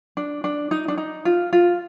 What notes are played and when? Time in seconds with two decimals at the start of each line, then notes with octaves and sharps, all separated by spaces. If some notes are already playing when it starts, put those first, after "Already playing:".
0.17 D4
0.44 D4
0.71 D#4
0.88 D4
0.98 D#4
1.25 F4
1.53 F4